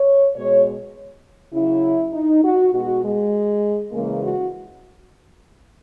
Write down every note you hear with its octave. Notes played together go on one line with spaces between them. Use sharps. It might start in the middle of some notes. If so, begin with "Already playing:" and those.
Already playing: C#5
B2 G#3 C#5
C#3 F#3 E4
D#4
F#4
B2 G#3 F#4
G#3
C#3 E3 G#3 A#3
F#4